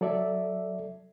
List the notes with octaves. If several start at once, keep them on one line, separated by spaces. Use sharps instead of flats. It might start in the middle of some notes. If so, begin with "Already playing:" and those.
F#3 A4 D5 E5